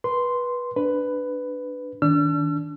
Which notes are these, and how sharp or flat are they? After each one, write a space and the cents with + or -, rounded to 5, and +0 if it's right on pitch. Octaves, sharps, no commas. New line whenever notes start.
B4 -20 C6 -5
D4 +0 B4 +10
D#3 +5 D4 -25 E6 +45